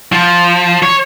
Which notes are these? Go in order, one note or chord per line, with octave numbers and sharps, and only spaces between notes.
F3
C#5